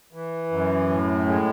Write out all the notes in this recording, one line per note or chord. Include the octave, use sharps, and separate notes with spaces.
E3
F#2
A2
G#3